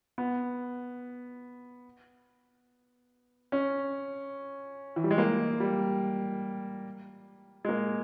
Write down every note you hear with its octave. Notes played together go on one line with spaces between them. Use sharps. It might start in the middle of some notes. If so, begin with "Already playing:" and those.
B3
C#4
E3
G3
G#3
A#3
G3
G#3
A#3